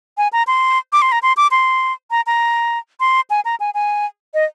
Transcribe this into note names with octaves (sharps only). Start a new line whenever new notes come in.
G#5
A#5
C6
D6
C6
A#5
C6
D6
C6
A#5
A#5
C6
G#5
A#5
G#5
G#5
D#5